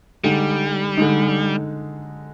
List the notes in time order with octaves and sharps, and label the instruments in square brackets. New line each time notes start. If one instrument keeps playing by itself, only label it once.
[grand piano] D3 G#3 D#4 [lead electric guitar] G3
[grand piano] D3 G#3 D#4